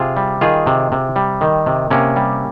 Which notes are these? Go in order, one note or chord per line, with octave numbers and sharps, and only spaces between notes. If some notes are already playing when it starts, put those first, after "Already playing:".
Already playing: C3 F4 G#4
G3
D#3 F4 G#4
C3
C3
G3
D#3
C3
C3 A#3 C#4
G3